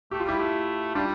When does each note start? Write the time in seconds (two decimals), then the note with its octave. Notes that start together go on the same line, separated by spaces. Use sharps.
0.11 A3 G4
0.20 F4
0.25 G3 E4 G4
0.39 A3
0.95 G3 D4 F4